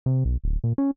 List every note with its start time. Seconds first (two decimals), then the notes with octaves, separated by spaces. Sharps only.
0.06 C3
0.25 B1
0.44 D1
0.64 A#2
0.78 C#4